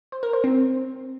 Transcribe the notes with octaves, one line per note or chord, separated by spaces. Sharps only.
C5
A#4
C5
C4